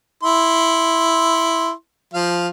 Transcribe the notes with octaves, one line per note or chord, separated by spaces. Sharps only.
E4 C6
F3 F5